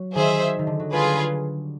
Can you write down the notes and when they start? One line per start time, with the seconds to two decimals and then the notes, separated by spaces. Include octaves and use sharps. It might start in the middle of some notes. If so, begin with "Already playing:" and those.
Already playing: F#3
0.15 D#3 G#4 C5 E5
0.59 D#3
0.67 D3
0.80 F#3
0.92 G3 F4 G#4 B4